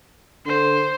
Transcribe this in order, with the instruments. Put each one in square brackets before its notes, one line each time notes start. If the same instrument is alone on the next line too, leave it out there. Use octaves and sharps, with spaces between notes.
[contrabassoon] D3 [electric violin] C5